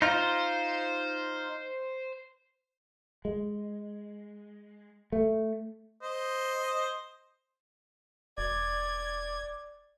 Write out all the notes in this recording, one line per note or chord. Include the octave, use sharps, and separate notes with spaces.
D#4 F4 C5
G#3
A3
C5 D#5
E1 D5 G#6